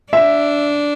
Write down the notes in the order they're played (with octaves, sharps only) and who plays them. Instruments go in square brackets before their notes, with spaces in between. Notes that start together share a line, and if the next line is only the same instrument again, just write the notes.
[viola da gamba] D4 [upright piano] E5